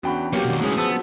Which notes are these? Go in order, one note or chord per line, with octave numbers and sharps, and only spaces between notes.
E2 C#4 D4 F#4 G5 B5
F#3 A#3 B3 F#4 G4 C#5
B2 D#3
A2 E3 G#3 C#4 G#4
F3 B3 A5 E6